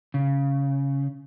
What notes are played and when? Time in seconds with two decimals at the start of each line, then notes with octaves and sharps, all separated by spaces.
0.14 C#3